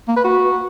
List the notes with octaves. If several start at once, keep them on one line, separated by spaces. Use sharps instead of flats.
A#3
B4
F#4